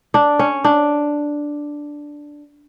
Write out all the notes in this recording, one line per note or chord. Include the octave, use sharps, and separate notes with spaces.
D4
C#4
D4